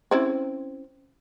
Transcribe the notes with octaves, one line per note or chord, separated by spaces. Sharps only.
C4 C#4 E4